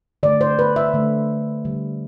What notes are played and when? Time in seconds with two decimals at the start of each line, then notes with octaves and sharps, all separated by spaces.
0.23 D3 A3 D5
0.41 C5
0.59 B4
0.76 E5
0.94 D3 A3
1.65 D3 G3